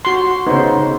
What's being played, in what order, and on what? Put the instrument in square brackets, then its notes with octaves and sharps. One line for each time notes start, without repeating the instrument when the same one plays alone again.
[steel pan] F#4 C6
[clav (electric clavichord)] C#3 B3 [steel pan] D#4 C5